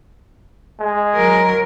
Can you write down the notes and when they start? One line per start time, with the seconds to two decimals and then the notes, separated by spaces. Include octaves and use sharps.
0.80 G#3
1.14 F#3 A#4